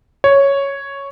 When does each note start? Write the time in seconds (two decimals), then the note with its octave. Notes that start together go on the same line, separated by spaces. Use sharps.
0.24 C#5